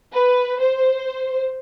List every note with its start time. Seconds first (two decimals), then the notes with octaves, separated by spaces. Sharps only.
0.12 B4
0.59 C5